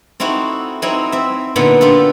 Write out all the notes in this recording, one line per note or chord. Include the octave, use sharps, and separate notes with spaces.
C4 D#4 E4 F#4 A4
F#3 C4 D#4 E4
C4 E5
A#2 D3 B3 D4 D#4
D4 F4 G4 A4